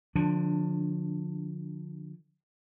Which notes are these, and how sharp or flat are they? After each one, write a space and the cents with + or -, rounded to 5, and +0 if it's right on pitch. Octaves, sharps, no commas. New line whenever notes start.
D3 +20 F3 +30 D4 +0